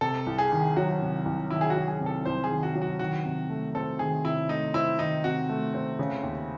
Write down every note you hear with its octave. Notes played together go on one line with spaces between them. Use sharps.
C3 A4
C2
G#4
D#3
F#3 F#4
C3
C2
D#3 E4
G#4
F#4
F#3
G#4
C3
A4
C2 C5
G#4
D#3
F#4
F#3
F#4
D#3 F#4
C3
A3
C4 A4
D#3 G#4
C3 E4
A3 D#4
C4 E4
D#3 D#4
C3 F#4
A3
C4
C#3
D#2